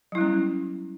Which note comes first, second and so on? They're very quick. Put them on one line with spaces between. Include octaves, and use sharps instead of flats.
F#3 E4 G3 C#4 B3